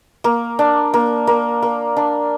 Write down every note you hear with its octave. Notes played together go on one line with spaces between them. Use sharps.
A#3
D4
A#3
A#3
A#3
D4